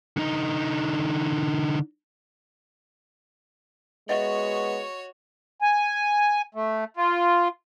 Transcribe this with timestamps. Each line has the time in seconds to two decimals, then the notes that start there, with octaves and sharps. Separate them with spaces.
0.17 D3 D#4
4.09 G#3 B3 F#4 C#5 D#5 E5 F#5
5.61 G#5
6.55 A3
6.97 F4